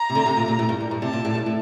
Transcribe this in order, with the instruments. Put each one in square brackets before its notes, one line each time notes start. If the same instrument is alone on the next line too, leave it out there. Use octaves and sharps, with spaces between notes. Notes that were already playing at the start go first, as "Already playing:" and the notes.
Already playing: [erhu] A#5
[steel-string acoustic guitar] C3
D3
C3
A#2
A#2
A2
G2
G2
G2
[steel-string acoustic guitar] C3 [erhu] A5
[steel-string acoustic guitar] A#2
A2
G2
A2